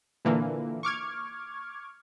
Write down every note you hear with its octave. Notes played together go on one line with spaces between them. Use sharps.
A#2 D3 E3 A#3
C#6 D6 F6 G#6